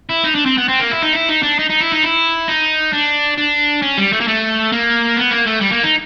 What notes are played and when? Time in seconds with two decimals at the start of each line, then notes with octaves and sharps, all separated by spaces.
0.09 E4
0.24 D#4
0.35 D4
0.46 C4
0.58 B3
0.68 C4
0.80 A#3
0.91 E4
1.02 D#4
1.13 E4
1.29 D#4
1.43 D4
1.59 D#4
1.69 D#4
1.80 E4
1.92 D#4
2.03 E4
2.48 D#4
2.93 D4
3.37 D4
3.82 C#4
3.97 G3
4.12 A3
4.20 A#3
4.27 A3
4.72 A#3
5.17 B3
5.31 A#3
5.47 A3
5.61 G3
5.72 A#3
5.84 D#4